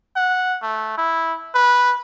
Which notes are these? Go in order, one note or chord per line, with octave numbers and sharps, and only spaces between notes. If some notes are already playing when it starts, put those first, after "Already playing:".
F#5
A3
E4
B4